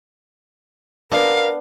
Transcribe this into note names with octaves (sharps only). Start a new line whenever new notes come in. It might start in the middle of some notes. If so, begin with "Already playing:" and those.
B3 D4 A#4 F5